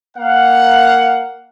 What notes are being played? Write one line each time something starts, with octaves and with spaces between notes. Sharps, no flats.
A#3 F5 F#5